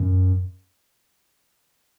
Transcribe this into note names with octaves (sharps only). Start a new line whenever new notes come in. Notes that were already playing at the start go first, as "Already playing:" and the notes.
Already playing: F#2